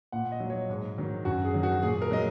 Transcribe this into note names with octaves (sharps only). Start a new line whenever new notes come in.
A#2 F#5
D#5
F#3
C#5
G#2
D#3 F#3
F#2 F#4
G#4
D#3 F#3
F#4
A#2 G#4
A#4
F#3 D#5